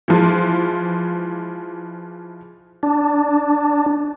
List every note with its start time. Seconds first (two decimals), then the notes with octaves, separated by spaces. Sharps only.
0.08 E3 F3 G#3
2.83 D4